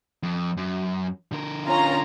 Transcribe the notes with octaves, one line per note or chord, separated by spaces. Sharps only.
F2
F#2
D3 A#4
C#4 F4 A#5